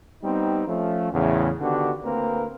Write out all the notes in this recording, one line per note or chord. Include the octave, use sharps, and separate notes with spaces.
G3 B3 C4 D#4
F3 A3 C#4
E2 A2 C#3
D3 D#3 B3 D4 F#4 G4
D2 A#3 C4 A#4 B4